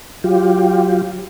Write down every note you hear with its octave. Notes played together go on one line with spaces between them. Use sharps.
F#3 F4 G4